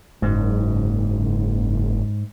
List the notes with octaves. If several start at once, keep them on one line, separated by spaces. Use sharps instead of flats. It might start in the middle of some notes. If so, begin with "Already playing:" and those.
F#1 G#2